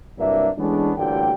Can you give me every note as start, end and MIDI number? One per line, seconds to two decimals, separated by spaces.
0.19 0.48 36
0.19 0.48 43
0.19 0.48 54
0.19 0.48 58
0.19 0.48 62
0.19 0.48 76
0.58 0.92 52
0.58 0.92 56
0.58 0.92 57
0.58 0.92 59
0.58 0.92 61
0.58 0.92 62
0.97 1.32 33
0.97 1.32 38
0.97 1.32 46
0.97 1.32 50
0.97 1.32 55
0.97 1.32 79